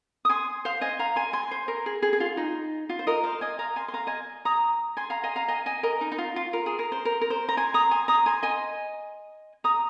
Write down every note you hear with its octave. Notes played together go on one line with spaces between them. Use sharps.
D#6
G#5 C6
C5 F5
D#5 G#5
F5 A#5
G#5 C6
G#5 C6
C5
A#4
G#4
G#4
G#4
F4
D#4
F4
C5
A#4 D#5
C5 F5
D#5 G#5
F5 A#5
G#5 C6
C6
F5 A#5
D#5 G#5
A#5 D#6
G#5 C6
F5 A#5
D#5 G#5
F5 A#5
D#5 G#5
D#5 G#5
A#4 D#5
D#4
D#4
F4
F4
A#4
G#4
A#4
C5
A#4
A#4
C5
A#5
G#5 C6
A#5 D#6
G#5 C6
A#5 D#6
G#5 C6
D#5 G#5
A#5 D#6